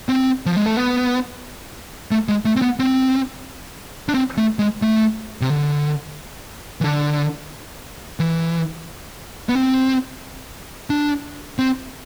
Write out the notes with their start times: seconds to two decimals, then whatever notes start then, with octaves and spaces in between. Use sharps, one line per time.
0.09 C4
0.46 F3
0.56 G#3
0.66 A3
0.77 B3
2.11 A3
2.28 G#3
2.45 A3
2.56 C4
2.62 B3
2.79 C4
4.09 D4
4.14 C4
4.37 A3
4.59 G#3
4.82 A3
5.41 C3
5.50 D3
6.81 E3
6.84 D3
8.20 E3
9.49 B3
9.55 C4
10.90 D4
11.59 C4